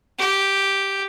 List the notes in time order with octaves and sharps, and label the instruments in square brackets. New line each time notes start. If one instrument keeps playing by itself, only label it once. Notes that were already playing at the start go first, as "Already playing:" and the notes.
[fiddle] G4